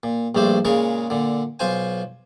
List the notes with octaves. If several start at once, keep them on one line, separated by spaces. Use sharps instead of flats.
A#2
A#1 G2 A3 D4 C5
A#2 C#3 G#3 A#4 C#6
A#2 D3
B1 F4 C5 G#5